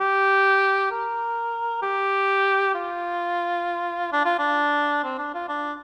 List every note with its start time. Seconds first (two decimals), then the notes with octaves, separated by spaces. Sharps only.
0.01 G4
0.91 A#4
1.82 G4
2.75 F4
4.13 D4
4.25 F4
4.39 D4
5.04 C4
5.18 D4
5.35 F4
5.49 D4